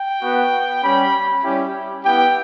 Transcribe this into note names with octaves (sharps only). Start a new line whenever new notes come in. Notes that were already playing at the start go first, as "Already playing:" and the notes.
Already playing: G5
B3 F#4
G3 C#4 G4 B5
G3 C#4 E4 G4
B3 E4 G4 G5